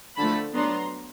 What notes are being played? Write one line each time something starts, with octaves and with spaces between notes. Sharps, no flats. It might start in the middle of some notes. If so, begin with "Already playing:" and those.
D3 F3 A3 A5 B5
F#3 B3 D4 A#5 C6